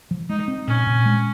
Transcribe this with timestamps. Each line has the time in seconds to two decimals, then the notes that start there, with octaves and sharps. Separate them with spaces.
0.11 F3
0.29 G#3 D#4
0.48 C4
0.68 A#2 C#4
0.87 A#2
1.06 G#3